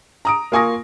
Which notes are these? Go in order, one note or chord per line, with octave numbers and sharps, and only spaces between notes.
A#5 D#6 D7
A#3 F4 G#5 C#6 D#6 A#6